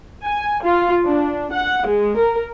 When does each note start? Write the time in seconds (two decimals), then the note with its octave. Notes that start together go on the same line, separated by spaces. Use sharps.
0.23 G#5
0.62 F4
1.06 D4
1.52 F#5
1.87 G#3
2.18 A#4